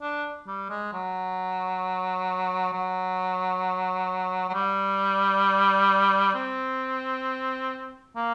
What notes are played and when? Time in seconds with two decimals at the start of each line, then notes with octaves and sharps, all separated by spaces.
0.02 D4
0.47 G3
0.69 G#3
0.93 F#3
2.73 F#3
4.49 F#3
4.54 G3
6.34 C4
8.16 A#3